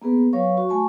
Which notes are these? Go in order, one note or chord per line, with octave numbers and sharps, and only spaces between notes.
A#3 B3 G#4 B4
F#3 B4 C#5 F5 C#6
F#4 C#6
A3 G#5 A5 C#6